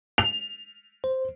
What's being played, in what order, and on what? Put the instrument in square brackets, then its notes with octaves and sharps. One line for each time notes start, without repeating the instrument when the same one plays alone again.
[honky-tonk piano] F7
[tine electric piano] C5